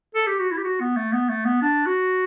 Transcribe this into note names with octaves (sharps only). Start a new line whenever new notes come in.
A4
G4
F#4
E4
G4
F#4
B3
A3
B3
A3
B3
D4
F#4